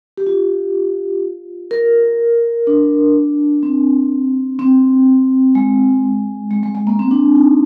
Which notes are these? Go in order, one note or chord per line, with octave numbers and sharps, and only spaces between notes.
G4
F4
A#4
D4
C4
C4
G#3
G#3
G#3
G#3
A#3
C4
D4
D#4